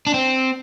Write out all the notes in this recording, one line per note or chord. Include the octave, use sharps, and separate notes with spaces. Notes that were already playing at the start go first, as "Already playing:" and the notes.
D4
C4